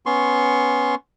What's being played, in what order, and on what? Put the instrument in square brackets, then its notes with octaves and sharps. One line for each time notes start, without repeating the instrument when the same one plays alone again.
[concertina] B3 C#4 C6 C#6